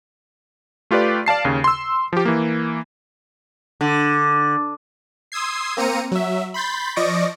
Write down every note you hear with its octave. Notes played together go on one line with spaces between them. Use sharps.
A3 F4 G4 B4 D5
D5 F5 A5 C7
D#2 C#3
C6 E6
F3 G4
E3 A#3
D3
C6 D#6 E6 G#6 C7
A#3 C4 A#5 C#7 D#7
F#3 E5
B5 C6 G6 A6 B6
F3 D5 D#5 C#6 A#6 D7